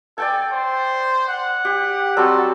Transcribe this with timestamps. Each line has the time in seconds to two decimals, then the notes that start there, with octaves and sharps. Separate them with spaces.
0.18 A4 D5 G5 G#5
0.52 C5
1.28 F#5
1.65 G4
2.17 F#3 G3 C4 A4